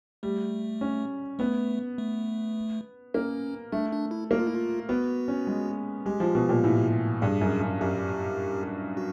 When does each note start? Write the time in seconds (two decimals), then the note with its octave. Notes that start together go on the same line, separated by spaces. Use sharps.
0.23 G3 A3
0.81 C#4
1.39 A3 B3
1.98 A3
3.14 A#3 C#4
3.72 A3 D4
3.92 D4
4.11 E4
4.31 A#3 F#4
4.39 F4
4.47 E4
4.55 F4
4.89 B3 F#4
5.28 C#4
5.47 G#3
6.06 G#3 G4
6.20 F3
6.35 B2
6.49 A#2
6.64 A2
7.22 G2 G#4
7.41 F#2
7.61 F#2
7.81 F#2 G4
8.97 F#4